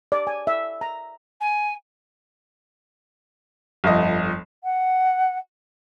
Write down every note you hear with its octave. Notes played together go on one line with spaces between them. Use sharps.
D5
G#5
E5
A#5
G#5
G1 F2 D#5
F#5